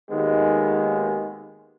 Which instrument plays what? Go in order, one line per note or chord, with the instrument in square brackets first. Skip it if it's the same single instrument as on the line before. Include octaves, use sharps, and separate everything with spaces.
[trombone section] G#1 D#2 D#3 G#3 B3 G#4